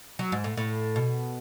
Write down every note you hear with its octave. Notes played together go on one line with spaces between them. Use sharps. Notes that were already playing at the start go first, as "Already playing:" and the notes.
F#3
G#2
A2
A2
B2